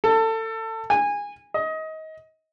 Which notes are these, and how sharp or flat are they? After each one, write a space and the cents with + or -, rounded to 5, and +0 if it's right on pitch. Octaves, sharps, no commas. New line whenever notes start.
A4 +25
G#5 -20
D#5 +25